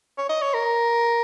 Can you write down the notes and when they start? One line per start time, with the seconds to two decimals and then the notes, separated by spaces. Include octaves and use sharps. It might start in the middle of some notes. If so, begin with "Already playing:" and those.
0.18 C#5
0.29 D#5
0.42 C#5
0.54 A#4